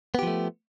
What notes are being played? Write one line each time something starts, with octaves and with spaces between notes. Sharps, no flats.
F3 A3 B3 G4